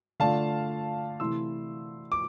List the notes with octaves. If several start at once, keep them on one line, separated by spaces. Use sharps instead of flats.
D3 A3 D4 F4 F5 A5
C3 E3 A3 E4 C6 E6
D6